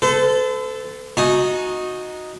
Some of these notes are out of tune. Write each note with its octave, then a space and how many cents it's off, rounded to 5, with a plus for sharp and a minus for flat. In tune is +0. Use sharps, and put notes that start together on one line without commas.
A4 -5 C5 -45
D#4 +0 F#4 -15 G#5 +35